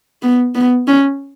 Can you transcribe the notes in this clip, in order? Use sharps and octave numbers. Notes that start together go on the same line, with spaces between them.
B3
B3
C#4